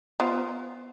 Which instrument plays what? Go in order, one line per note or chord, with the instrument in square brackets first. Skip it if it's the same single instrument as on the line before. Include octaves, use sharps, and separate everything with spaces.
[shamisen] B3 F4 C5